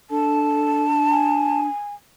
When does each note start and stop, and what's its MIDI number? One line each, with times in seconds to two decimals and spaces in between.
0.10 1.69 62
0.10 0.85 69
0.10 1.60 81
1.11 1.94 80